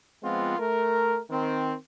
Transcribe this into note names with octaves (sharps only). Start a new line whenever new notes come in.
F3 G#3 B3 C4 F4
A3 A#4
D#3 C4